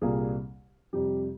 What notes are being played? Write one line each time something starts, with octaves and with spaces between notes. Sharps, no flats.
C2 A#2 G3 A#3 G#4
F2 C3 G3 G4